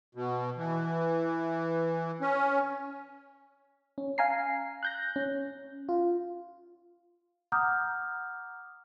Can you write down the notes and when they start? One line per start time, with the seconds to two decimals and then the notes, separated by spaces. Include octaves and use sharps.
0.15 B2
0.57 E3
2.21 C#4
3.98 C#4
4.18 F5 G#5 A#5 C7
4.83 F#6 G6 A#6
5.16 C#4
5.89 F4
7.52 F#5 A#5 D6 D#6 F6 G6